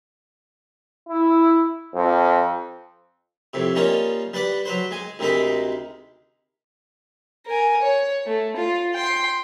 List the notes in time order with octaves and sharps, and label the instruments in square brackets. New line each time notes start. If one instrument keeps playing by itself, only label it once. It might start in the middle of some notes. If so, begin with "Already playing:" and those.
[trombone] E4
F2
[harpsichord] F2 A2 C3
G3 A#3 C#4 D#4 F4 C#5
G3 B4 D5 F#5
F#3 B4 C5
G#3 G#5
D2 C3 D#3 G#3 D#4 B5
[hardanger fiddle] A#4 G#5
C#5
A3
F4
G5 C6